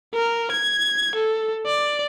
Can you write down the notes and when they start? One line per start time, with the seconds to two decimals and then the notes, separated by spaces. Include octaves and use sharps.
0.14 A#4
0.51 G#6
1.15 A4
1.66 D5